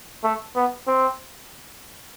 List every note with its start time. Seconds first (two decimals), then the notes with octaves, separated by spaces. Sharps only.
0.24 A3
0.55 B3
0.88 C4